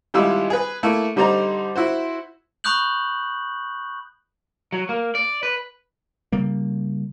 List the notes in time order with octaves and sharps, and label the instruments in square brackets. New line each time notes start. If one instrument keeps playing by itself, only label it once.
[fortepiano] G#1 G3 G#3 E4 F4 E6
G#4 B4
A3 A#3 E4
D3 G3 D#4 C5 D5 A#5
E4 F#4 C5
[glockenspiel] B5 C#6 D#6 F#6 G6 F#7
[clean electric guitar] F#3
A#3
D5
B4
[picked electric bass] C#3 G3 A#3